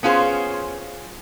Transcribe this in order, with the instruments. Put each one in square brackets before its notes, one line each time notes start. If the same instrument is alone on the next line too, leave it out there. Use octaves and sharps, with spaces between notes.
[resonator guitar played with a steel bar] B3 C#4 F4 G#4 C5